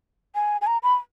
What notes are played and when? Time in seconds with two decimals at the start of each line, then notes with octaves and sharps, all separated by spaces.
0.35 G#5
0.61 G#5
0.67 A#5
0.83 B5